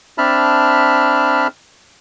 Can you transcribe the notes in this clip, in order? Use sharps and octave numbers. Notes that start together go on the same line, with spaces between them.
C4 D4 E5 A5 B5 F6